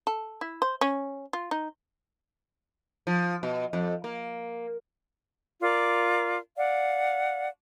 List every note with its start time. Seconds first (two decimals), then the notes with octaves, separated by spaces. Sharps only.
0.07 A4
0.41 E4
0.62 C5
0.81 C#4
1.33 F4
1.51 D#4
3.07 F3
3.43 B2
3.73 F2
4.04 A#3
5.61 F4 A#4 D5 D6
6.56 D5 F5 F#5